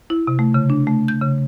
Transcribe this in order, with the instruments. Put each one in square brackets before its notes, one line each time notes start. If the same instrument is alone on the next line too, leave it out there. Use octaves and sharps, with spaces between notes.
[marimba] E4
C3
A3
C#3
D4
A3
G6
C#3